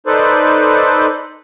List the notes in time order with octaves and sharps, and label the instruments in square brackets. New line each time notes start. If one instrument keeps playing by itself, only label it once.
[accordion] D#4 A4 B4 C5 D5